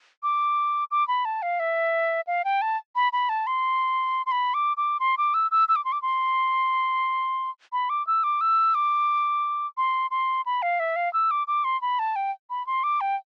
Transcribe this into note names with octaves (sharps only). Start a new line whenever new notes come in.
D6
D6
B5
A5
F5
E5
F5
G5
A5
B5
B5
A5
C6
C6
B5
D6
D6
C6
D6
E6
E6
E6
D6
C6
D6
C6
B5
D6
E6
D6
E6
D6
C6
C6
B5
F5
E5
F5
E6
D6
D6
C6
B5
A5
G5
B5
C6
D6
G5